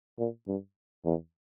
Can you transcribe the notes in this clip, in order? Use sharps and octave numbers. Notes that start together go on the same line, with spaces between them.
A#2
G2
E2